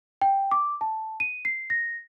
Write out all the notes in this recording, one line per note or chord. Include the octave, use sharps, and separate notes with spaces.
G5
D6
A5
D#7
C7
A#6